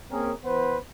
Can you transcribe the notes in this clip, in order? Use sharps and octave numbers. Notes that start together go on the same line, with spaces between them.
A#3 C4 C#4 G#4 A#4
E3 B3 B4 C5